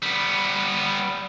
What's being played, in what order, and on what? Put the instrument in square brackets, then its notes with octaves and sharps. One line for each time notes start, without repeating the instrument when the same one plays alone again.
[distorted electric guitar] G3 B3